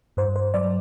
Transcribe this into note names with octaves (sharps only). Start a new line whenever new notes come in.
G2 C5
C5
F#3 D5